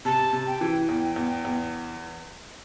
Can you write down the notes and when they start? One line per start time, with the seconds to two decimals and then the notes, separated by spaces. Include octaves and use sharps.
0.05 C3 A5
0.33 C3
0.47 G5
0.61 E3
0.89 E2 G5
1.16 E2
1.45 E2